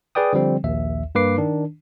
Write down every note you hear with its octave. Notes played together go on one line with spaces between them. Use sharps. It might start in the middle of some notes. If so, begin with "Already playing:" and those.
G#4 B4 D5 G5 D#6
D3 F3 G3 C4
A#1 D#2 E5
G2 A#3 B4 D6 C7
D#3 D4